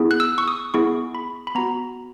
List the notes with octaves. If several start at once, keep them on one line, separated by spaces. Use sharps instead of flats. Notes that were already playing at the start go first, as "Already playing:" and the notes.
Already playing: B3 E4 G#4
F#6
E6
C#6
D#6
B3 E4 G#4 C#6
B5
B5
B3 F#4 A#5